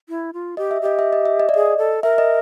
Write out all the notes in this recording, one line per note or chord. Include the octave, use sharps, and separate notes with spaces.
E4
F4
G4 D#5
E5
G4 D#5
E5
D#5
E5
D#5
D5
G#4 D#5
A4
A#4 E5
D#5